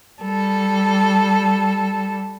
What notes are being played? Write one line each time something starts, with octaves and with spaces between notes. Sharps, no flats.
G3 A4